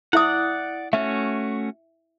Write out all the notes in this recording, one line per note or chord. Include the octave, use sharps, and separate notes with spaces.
E4 D5 E5 F#5 D#6
A3 C#4 F#4 E5